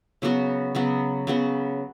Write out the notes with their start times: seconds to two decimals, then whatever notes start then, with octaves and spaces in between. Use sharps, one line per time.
0.22 C#3 F#3 B3 F#4
0.75 C#3 F#3 B3 F#4
1.27 C#3 F#3 B3 F#4